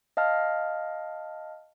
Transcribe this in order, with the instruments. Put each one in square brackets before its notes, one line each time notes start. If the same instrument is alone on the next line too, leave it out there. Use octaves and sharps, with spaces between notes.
[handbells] D#5 F5 A5 F6